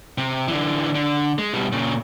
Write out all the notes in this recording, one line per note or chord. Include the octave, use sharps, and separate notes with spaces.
C3
D3 E3
D3
G#3
B2 G3
A#2 C#3